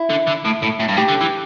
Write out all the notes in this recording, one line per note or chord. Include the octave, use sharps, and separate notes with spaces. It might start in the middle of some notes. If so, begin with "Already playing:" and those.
Already playing: E4
D3
D3
A2
A2
A2
G2
A2 G4
D3
E3